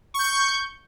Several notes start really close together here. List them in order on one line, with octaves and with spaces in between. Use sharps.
C#6 G6 C#7